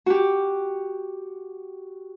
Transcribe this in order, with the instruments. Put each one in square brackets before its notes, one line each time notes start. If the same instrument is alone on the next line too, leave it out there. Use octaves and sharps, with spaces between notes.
[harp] F#4 G4